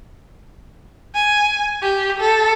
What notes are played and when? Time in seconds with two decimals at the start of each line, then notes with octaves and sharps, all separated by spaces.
1.15 G#5
1.82 G4
2.20 A4